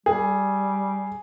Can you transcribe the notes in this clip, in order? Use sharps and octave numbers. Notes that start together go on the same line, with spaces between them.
G3 G#4